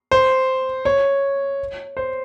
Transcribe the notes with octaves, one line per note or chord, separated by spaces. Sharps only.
C5
C#5
C5